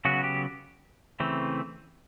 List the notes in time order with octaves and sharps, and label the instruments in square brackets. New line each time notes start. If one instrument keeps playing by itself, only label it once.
[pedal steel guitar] C#3 F#3 B3 F#4
G4
C#3 E3 A3 C4